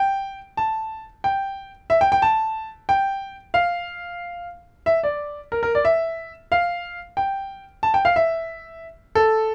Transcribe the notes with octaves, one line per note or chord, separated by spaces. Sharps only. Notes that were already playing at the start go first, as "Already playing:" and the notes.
Already playing: G5
A5
G5
E5
G5
G5
A5
G5
F5
E5
D5
A#4
A#4
D5
E5
F5
G5
A5
G5
F5
E5
A4